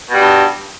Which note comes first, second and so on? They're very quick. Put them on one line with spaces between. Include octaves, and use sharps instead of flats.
B2 G3 G2